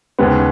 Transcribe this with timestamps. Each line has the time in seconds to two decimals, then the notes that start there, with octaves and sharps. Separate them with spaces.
0.19 D#2 C#3 G#3 B3